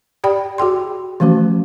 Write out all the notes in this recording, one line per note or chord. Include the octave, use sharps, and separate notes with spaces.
G4 D5 G5 B5
F#4 G#4 G5 C6
E3 F3 A3 C#4 F#4